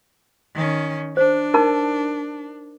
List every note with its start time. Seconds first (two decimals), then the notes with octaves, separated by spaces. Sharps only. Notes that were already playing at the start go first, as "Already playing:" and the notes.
0.55 D#3 C#4
1.17 D4 C5
1.54 D#4 A#4 A5